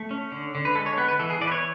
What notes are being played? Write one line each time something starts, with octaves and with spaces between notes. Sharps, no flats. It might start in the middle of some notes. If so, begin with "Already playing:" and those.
Already playing: A3
C#4
D3
D3
B4
G#3 A4
C#5
B3 B4
B4
E3 A4
G#4
E3 D5
B4
C#5